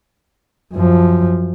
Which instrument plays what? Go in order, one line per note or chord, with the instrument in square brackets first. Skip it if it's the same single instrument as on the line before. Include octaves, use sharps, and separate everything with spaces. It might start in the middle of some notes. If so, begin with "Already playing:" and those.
[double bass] F#2 F3